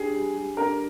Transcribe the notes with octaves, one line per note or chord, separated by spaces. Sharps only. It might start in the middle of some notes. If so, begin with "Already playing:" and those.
Already playing: D4 G4 G#4
G3
G3
D4 A#4